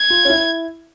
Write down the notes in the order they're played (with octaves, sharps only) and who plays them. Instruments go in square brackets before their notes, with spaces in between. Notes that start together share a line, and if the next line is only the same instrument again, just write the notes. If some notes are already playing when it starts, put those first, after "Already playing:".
Already playing: [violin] G#6
[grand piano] F4
C#4
E4